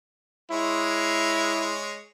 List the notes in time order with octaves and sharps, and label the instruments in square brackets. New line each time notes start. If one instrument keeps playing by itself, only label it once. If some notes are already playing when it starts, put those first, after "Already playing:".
[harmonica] G#3 C#5 [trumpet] E4